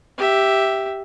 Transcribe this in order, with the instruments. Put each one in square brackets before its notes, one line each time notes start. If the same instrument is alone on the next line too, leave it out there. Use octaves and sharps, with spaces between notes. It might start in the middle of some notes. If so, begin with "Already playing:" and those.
[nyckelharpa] G4 E5